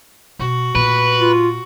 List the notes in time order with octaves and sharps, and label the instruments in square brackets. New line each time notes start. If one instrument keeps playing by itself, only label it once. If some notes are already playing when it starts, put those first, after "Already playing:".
[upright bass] B2 [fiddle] F#4
[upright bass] A#2 A3 [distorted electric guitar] B4
[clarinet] F4